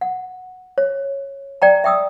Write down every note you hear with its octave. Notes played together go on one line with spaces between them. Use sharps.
F#5
C#5
D5 G5 A#5
E5 G5 D#6 E6